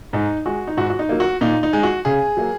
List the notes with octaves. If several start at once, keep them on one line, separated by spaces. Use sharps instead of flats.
G#2 D#4
G#3 F#4
D#4
G#2 F#4
F#4
D#4
F#3 A#3
F#4
A#2 D#4
D#4
G#3
F#4
C#3 G#4
F#3 A#3